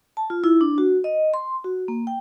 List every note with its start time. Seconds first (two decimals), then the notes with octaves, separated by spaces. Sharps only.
0.17 A5
0.30 F4
0.44 E4
0.61 D4
0.78 F#4
1.04 D#5
1.34 C6
1.64 F#4
1.88 A#3
2.07 G5